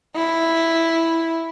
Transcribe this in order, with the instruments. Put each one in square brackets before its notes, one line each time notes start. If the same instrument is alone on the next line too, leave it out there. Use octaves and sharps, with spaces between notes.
[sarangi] E4